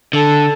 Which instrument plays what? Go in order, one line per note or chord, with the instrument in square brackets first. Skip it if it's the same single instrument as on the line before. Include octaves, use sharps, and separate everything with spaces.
[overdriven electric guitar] D3 [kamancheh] A4